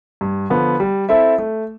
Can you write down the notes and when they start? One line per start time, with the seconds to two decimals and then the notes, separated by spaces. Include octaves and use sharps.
0.21 G2
0.50 D3 F3 B3
0.80 G3
1.09 C4 E4 A4 E5
1.38 A3